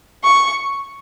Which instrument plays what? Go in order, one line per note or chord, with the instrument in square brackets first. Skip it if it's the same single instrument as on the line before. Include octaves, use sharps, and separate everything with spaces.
[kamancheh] C#6